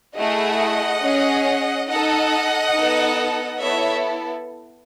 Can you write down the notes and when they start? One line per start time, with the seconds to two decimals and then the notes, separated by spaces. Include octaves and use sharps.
0.16 A3 E4 G#4 D#5 F#5
1.03 C#4 G#4
1.88 D#4 A4 D#5 F#5
2.75 B3 D#4 A4
3.60 B3 E4 A4 C#5 E5